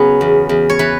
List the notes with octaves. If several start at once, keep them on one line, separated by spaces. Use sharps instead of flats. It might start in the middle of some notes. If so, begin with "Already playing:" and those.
Already playing: C#3 F#3 B3 C#4
E2
E2
C#5
E3 B4